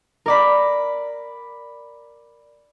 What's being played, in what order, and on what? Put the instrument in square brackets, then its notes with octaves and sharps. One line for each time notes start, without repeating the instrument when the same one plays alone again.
[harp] A#4 D5 B5